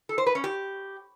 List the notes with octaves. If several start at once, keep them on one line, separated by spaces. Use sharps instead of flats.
A4
C5
B4
C#4
G4